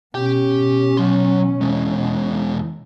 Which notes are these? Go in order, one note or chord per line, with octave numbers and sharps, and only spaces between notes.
B2 C#4 G4 G5
F#3 C6
E2 G#3